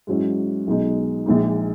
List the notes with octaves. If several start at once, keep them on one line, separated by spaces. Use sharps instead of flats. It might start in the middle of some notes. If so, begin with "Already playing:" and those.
G#2 F#3 C#4 E4
B1 B2 G#3 D#4
A#1 A#2 G#3 D#4